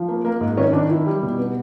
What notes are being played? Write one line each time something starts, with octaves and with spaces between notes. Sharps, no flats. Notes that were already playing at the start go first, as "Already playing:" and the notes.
Already playing: F3
A#3
A#3
G#2
D#3 C#4
D#3 D4
D#3 E4
G3
B2
B3